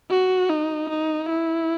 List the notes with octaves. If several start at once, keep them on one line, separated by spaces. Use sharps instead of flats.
F#4
D#4
D#4
E4